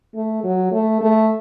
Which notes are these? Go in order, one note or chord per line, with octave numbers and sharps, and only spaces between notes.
A3
F#3
A3
A3